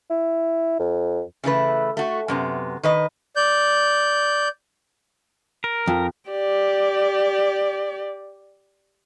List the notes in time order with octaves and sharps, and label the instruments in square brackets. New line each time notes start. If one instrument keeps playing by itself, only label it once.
[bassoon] E4
F2
[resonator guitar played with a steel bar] C#3 E3 A3 B4
A3 F#4
F#2 C3 B3
D#3 B4 D#5
[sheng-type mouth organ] D5 G6
[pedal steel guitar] A#4
[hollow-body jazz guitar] F2
[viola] G4 D5